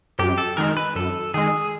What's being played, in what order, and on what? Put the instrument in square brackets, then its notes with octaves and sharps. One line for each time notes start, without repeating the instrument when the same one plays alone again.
[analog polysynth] F#2 [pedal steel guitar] G4
[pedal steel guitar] A4
[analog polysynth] D#3 G#3 [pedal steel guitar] A#4
[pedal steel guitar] B4
[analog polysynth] F#2 [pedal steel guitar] A4
[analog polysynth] D#3 G#3 [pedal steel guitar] G#4